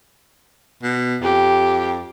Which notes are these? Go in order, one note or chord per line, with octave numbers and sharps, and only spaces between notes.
B2
F2 G4